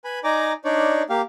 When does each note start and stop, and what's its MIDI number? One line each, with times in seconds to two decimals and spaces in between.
0.04 0.19 71
0.04 0.19 80
0.04 0.19 83
0.24 0.53 63
0.24 0.53 74
0.24 0.53 80
0.24 0.53 82
0.24 0.53 86
0.65 1.02 62
0.65 1.02 63
0.65 1.02 73
0.65 1.02 74
1.10 1.22 58
1.10 1.22 67
1.10 1.22 77